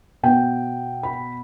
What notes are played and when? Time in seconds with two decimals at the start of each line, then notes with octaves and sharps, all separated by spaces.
0.23 B2 B3 G5
1.03 B5